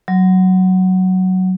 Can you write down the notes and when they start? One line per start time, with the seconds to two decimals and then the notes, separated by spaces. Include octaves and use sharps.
0.08 F#3